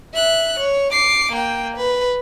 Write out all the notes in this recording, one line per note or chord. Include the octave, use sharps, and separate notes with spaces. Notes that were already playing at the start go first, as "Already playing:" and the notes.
E5 F#6
C#5
D6 C7
A#3 G5
B4